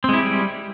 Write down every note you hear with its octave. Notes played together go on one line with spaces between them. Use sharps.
G3 G#3 C4 E4 G4